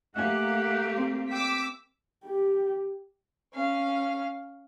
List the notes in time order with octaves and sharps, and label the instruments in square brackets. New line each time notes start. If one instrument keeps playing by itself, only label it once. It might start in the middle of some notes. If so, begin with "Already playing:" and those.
[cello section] A3 A#3 G4 [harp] E5 G#5 [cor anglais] F#5
[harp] C4
[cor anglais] G5 [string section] D6 E6 B6
[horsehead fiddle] G4
[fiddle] C#4 F5